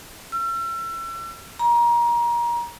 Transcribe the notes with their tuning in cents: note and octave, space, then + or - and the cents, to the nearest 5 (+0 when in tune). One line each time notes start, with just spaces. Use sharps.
E6 +40
A#5 +25